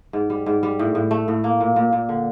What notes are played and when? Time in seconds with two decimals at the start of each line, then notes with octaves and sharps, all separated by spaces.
0.13 G#2
0.30 G3
0.46 G#2
0.63 G3
0.79 A2
0.95 A2
1.11 A3
1.28 A2
1.44 A#3
1.60 A#2
1.76 A#2
1.93 A#2
2.09 D3